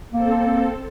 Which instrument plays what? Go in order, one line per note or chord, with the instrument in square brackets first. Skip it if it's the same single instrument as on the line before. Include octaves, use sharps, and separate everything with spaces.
[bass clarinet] A#3 [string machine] C4 A4